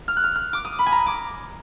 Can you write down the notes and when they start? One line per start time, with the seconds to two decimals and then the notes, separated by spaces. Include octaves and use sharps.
0.08 F6
0.17 F#6
0.24 F6
0.35 F6
0.53 D6
0.65 D#6
0.79 B5
0.86 G#5
0.92 A#5
1.06 D6